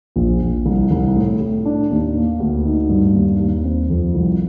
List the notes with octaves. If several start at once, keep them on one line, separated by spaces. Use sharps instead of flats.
A#1
A#1
C2
C2
A2
A2
D4
D#2
A#3
D2
D#4
G2
D#2
D#2
C4
F2
C2